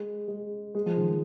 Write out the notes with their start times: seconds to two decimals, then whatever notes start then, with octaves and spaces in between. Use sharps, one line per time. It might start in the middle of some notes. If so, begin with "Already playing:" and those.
Already playing: G#3
0.28 G#3
0.75 G#3
0.86 F3
0.97 D#3
1.09 F3